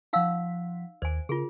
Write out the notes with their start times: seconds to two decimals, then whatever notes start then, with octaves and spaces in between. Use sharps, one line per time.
0.13 F3 D#4 F5 F#5 E6 B6
1.02 D#2 C5 G#5 G#6
1.29 C#3 F4 G#4 A#4